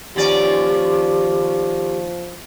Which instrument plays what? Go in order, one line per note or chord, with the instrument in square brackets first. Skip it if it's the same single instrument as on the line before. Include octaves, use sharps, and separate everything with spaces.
[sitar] D#2 C#4 D5 [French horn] F3 [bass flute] G4